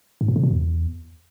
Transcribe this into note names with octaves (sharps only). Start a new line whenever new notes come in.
G#2
A#2
C#3
B2
E2